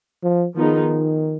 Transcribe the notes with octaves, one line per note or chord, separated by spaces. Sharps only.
F3
D#3 F3 B3 D#4 G#4